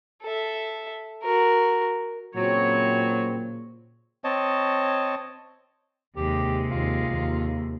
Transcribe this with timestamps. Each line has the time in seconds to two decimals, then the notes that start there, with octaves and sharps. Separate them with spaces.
0.22 A4 E5
1.23 F#4 A#4
2.35 A#2 C#3 F#3 C4 C#5
4.24 C4 C#5 D#5 A5
6.16 D#2 C3 G#3 G4
6.71 D#2 F4
7.11 D#2